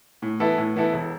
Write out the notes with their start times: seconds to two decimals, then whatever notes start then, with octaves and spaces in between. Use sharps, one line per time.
0.22 A2
0.40 E3 B3 E4 A4
0.58 A2
0.76 E3 B3 E4 A4
0.92 E1